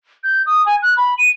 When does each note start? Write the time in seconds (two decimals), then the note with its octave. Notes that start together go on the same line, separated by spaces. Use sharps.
0.24 G6
0.46 D#6
0.66 G#5
0.82 F#6
0.97 B5
1.18 D#7